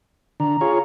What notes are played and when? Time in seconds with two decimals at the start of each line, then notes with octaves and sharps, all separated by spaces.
0.40 D3 A#5
0.61 F4 G#4 C#5